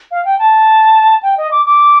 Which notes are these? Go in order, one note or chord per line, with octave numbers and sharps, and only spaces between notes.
F5
G5
A5
G5
D#5
D6
D6